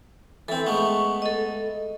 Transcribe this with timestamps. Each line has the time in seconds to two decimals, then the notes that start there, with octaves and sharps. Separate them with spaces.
0.48 E3 C4 A4
0.66 G#3 A3 B3 C#6
1.22 A4 D#5